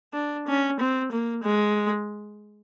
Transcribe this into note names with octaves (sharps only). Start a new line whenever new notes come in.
D4
C#4
C4
A#3
G#3